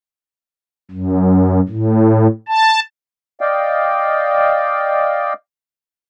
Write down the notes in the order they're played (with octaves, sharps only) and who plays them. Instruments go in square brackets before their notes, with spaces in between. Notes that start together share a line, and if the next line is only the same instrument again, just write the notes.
[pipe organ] F#2
A2
A5
[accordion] D5 D#5 F5 G5